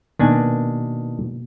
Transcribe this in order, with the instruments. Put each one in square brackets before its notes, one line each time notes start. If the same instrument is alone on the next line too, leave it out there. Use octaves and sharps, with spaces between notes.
[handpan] B2 A#3 B3 [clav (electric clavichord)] D#3 D4 G#5